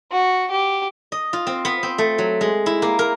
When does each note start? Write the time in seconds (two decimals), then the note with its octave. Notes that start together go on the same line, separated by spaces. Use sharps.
0.11 F#4
0.50 G4
1.12 D#5
1.33 F4
1.47 C4
1.65 B3
1.83 C4
1.98 A3
2.18 F#3
2.41 G#3
2.66 E4
2.82 A#3
2.99 A#4